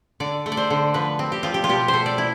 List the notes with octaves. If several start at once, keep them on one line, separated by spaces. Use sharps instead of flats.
D3 D5
A3
D5
C5
D3
F3 B4
C4
G4
F3 F4
G4
F4
B2 G4
C5
A3
D5
E4